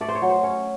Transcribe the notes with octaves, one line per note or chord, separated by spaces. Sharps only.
A3 D5
C5
C#5
F#3
C5
C#4 C#5